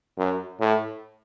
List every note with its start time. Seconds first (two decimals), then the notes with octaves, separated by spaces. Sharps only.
0.18 F#2
0.60 A2